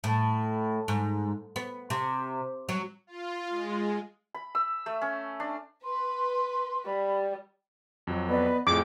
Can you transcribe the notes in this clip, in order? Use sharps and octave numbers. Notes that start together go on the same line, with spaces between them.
A2
G#2
B3
C3
F#3
F4
G#3
B5
E6
A3
C#4
D4
B4 C6
G3 B5
F2 F#3
B3 B4 D5 D#5
F2 A2 G#4 G5 D6